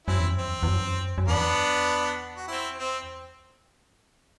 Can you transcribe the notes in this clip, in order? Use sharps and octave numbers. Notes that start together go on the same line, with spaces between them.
F#2 C4 E4
E2
F#2
C4
E2
E2
F#2
F#2
E2 B3 D4
F#4
C4 E4
C4